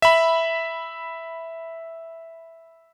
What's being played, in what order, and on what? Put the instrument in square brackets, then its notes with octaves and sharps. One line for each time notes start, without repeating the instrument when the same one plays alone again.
[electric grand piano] E5 B5